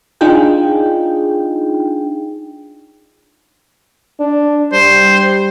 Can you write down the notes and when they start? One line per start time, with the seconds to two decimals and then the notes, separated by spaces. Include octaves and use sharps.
0.21 D4 D#4 F4 G#4 G5
4.20 D4
4.73 G3 C5